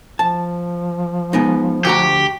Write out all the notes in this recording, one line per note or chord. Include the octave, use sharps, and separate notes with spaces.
F3 A5
G#3 B3 D#4
D2 F#4 G4 A#5